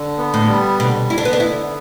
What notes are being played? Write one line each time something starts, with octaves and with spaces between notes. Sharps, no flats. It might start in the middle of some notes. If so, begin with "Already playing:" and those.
Already playing: D3
B3
A2
G3
B2 D3
D3 E4
D4
B3
D4
B3 E4